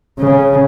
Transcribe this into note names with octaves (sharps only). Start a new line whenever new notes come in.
C#3